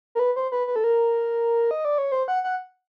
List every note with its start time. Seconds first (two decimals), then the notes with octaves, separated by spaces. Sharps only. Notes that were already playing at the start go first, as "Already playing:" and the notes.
0.15 A#4
0.19 B4
0.36 C5
0.52 B4
0.67 B4
0.76 A4
0.84 A#4
1.71 D#5
1.85 D5
1.98 C#5
2.12 C5
2.28 F#5
2.44 F#5